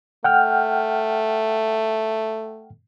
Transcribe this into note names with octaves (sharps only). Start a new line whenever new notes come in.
A3 F#5 G5 F6